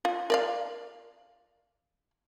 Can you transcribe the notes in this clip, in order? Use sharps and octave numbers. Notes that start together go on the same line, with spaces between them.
F4
A#4 D5 F5